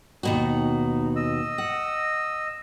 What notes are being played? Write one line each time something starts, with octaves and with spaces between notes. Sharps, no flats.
D#2 B2 D#4 F#4
D#5 E6
F#5